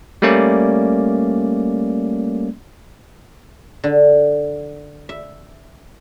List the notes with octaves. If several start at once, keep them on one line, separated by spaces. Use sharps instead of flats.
G3 A3 A#3 C#4 D5
D3
E5